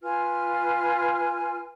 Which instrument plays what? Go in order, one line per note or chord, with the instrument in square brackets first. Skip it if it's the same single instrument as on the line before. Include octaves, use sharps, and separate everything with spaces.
[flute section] F4 B4 G#5 F6